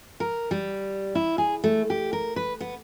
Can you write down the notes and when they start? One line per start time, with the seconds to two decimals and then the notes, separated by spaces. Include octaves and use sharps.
0.20 A#4
0.51 G3
1.15 E4
1.38 G#4
1.64 A3
1.90 G4
2.13 A#4
2.36 B4
2.61 B3